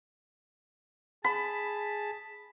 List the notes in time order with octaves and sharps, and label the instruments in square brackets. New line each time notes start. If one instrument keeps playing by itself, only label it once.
[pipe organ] G#4 A5 [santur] B5